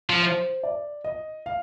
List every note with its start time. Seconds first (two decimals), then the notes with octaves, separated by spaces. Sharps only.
0.10 F3
0.23 C5
0.64 D5
1.04 D#5
1.46 F5